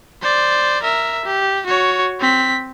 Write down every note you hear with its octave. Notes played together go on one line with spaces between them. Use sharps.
C5 D5
A#4 E5
G4
F#4 C#5
C4 B6